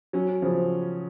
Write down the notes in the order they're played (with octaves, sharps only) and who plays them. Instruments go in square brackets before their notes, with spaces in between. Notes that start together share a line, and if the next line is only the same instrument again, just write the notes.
[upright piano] F#3 [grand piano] C#4
[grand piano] C#3 [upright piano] F3